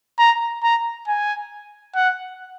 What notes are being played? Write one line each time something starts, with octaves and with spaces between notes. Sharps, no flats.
A#5
A#5
G#5
F#5